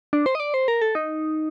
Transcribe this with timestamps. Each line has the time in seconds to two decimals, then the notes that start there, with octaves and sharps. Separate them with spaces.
0.13 D4
0.26 C5
0.35 D#5
0.40 D5
0.54 C5
0.68 A#4
0.82 A4
0.95 D#4